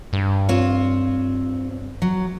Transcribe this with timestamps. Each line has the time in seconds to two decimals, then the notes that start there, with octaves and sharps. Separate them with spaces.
0.13 G2
0.49 C4 F4 C#5
2.02 F#3